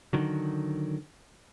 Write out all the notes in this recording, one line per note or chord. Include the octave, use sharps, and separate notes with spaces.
D3 D#3 F#3